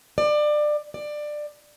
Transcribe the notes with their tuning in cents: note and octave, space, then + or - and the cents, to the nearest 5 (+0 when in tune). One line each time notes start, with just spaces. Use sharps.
D5 +25
D5 +20